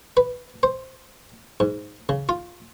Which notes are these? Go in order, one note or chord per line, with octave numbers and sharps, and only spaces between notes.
B4
C5
G#2
C#3
F4